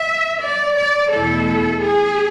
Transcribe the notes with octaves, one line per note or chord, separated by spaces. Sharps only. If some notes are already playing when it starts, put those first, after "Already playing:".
Already playing: E5
D5
D5
E2 B2 A3 E4 A4
G#4